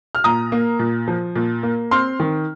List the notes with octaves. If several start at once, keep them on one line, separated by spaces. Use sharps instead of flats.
F6
A#2 A#5 D#6
A#3
A#2
F3
A#2
A#3
C4 C6 F6
D#3